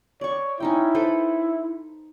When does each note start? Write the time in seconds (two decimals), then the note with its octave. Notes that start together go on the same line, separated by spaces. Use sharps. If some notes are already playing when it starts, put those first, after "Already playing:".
0.21 C#5 D5 C#6
0.60 C#4 D#4 E4 G5
0.95 A4 B4 C5